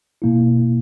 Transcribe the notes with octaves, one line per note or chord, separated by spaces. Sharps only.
B2 A#3 E4